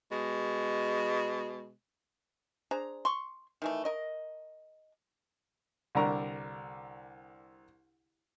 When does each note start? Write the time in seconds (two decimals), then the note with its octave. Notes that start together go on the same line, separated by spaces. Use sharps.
0.11 B2 G#3
2.71 D4 G#4 C5 A#5
3.05 C6 C#6
3.62 D#3 E3 A3
3.85 A#4 D#5
5.95 C2 D3 D4 A#4 A#5 C#6